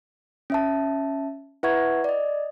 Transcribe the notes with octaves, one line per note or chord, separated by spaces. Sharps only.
C#4 E5 A5
E4 B4 E5 F#5 C#6 G#6
D5 D#5